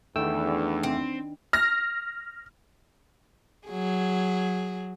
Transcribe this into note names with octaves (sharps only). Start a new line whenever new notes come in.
E2 D#3 A3 B3 D4 G5 E6
C4
F6 A#6
F#3 G#4